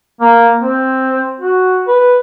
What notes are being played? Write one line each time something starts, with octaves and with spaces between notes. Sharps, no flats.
A#3
C4
F#4
B4